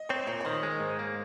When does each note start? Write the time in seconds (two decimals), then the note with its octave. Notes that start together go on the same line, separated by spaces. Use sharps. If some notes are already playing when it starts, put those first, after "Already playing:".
Already playing: D#5
0.09 C4 C#5
0.27 A#2 C#5
0.40 C#5
0.45 D#3 C5
0.63 G#3
0.80 G#2
0.99 A#3